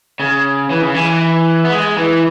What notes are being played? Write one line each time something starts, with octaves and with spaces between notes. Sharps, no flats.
C#3
E3
C#3
E3
B3
G#3
E3